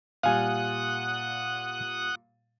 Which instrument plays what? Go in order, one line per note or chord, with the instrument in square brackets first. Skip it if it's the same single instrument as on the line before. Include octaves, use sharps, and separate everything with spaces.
[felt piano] A#2 G3 [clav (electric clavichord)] F5 G#5 [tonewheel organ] F#5 D#6 F#6